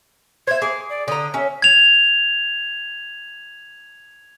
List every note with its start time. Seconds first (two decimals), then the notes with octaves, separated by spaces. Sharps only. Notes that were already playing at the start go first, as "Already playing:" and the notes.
0.47 C5 E5 G#6
0.62 G#4 D6
0.90 D5
1.08 D3 A#5 D#6
1.34 C#4 E5
1.62 G#6 F7